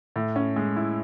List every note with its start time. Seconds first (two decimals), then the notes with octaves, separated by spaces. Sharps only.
0.16 A2
0.36 C#4
0.56 G#3
0.76 E4